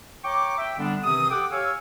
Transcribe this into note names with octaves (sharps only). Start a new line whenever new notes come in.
C#5 G5 A#5 C#6 D6
E5 G5
D3 G3 B3 D4
C3 D#3 E3 C4 D#6
G4 A4 F#5 G5 D6
G4 C#5 F5 G#5 C#6 E6